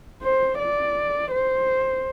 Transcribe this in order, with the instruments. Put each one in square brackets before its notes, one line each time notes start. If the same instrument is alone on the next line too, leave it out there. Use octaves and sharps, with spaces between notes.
[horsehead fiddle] C5
D5
C5